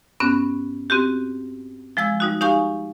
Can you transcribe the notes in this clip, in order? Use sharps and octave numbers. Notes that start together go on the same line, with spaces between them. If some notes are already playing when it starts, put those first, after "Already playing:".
G2 B3 C#4 F#6
C4 F#4 G4
F3 G#3 E6 G#6
G3 D#4 F#4
D#4 G4 F5 G#5 C#6